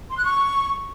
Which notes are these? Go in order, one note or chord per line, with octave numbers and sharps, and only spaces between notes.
C6
F#6
C#6